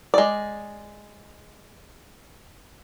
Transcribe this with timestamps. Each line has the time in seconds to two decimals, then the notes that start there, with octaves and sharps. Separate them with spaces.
0.14 G#3 D5